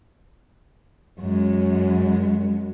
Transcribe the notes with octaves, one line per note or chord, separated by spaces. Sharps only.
F#2 G#3